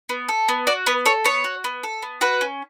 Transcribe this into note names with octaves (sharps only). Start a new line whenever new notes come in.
B3
A4
B3
F#4 D5
B3 B4
A4 C#5
B3 C#5
F#4
B3
A4
B3
F#4 B4
C#4